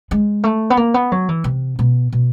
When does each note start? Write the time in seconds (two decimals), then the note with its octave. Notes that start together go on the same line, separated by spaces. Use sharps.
0.11 G#3
0.44 A3
0.70 B3
0.77 A#3
0.94 B3
1.12 F#3
1.29 E3
1.44 C3
1.79 B2
2.12 B2